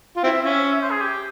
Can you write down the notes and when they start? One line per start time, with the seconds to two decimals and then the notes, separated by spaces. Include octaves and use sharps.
0.16 F4
0.24 C4 E4 E5
0.43 C#4 E5
0.73 E5
0.82 C5
0.91 G#4
1.01 G4